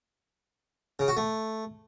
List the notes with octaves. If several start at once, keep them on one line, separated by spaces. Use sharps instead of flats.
C#3
F#4
A3